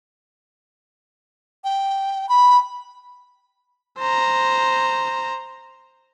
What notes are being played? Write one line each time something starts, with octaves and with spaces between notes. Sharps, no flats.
G5
B5
C5 A#5